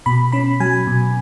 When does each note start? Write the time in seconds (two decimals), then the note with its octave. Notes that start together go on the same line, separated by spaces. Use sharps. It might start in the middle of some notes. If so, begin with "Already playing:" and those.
0.06 B2 B5
0.32 C#4 B5
0.60 F#3 G#5
0.87 B2